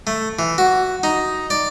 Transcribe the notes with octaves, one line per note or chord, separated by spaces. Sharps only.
A3
E3
F#4
D#4
D5